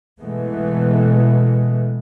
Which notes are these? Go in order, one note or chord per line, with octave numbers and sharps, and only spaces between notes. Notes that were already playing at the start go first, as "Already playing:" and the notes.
B2 E3 G#3 A3 B3